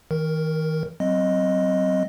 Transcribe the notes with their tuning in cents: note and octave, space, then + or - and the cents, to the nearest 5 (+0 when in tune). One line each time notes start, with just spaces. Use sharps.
D#3 +40 A#4 +0
F#3 +30 C4 +0 D#5 +0